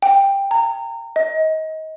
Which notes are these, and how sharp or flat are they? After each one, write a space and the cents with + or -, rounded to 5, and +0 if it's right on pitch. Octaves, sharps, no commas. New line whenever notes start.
G5 +10
A#5 -25
D#5 +25